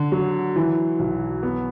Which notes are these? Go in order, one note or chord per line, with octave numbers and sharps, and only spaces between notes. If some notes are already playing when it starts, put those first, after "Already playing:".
Already playing: D3
F#3
E3
B1
B3